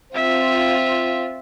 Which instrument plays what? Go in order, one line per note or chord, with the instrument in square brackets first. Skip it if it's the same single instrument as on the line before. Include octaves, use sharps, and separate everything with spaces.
[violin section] C4 F4 [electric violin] E5